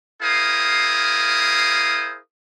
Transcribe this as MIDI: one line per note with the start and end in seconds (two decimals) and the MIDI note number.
0.22 2.19 64
0.22 2.19 68
0.22 2.19 70
0.22 2.19 72
0.22 2.19 77
0.22 2.19 87